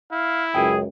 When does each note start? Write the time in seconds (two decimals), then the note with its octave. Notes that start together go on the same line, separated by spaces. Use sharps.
0.12 E4 F5
0.55 C#2 F#2 G#4 G5